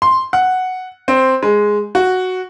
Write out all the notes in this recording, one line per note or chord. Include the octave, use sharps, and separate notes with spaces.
C6
F#5
C4
G#3
F#4